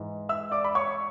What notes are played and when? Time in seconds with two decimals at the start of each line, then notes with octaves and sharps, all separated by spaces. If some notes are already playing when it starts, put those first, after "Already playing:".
Already playing: G#2 E3
0.29 E5 E6
0.51 D5 D6
0.64 B5
0.75 C#5 C#6